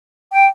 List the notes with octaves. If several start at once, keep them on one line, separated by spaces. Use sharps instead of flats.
G5